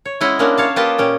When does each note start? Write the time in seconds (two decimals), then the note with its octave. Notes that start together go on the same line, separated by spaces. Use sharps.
0.05 C#5
0.21 G#3 C#4 E4 D#5 F#5
0.39 G#3 A#3 C#4 D4 F#4
0.58 C#5 F5 A5
0.76 A#3 F4 G4 B4 D#5 A5
0.98 A#2 C#4 G5